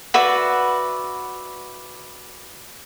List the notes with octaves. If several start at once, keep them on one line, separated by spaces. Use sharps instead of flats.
F#4 B4 D5 E5